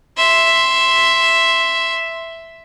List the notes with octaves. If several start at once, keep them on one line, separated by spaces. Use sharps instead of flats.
E5 C6